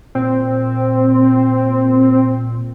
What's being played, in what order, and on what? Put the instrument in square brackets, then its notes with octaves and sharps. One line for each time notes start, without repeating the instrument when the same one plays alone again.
[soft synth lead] A#2 [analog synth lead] C4